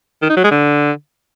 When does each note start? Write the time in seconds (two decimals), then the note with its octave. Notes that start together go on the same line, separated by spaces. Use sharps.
0.22 D#3
0.29 D#4
0.37 F#3
0.44 G#3
0.51 D3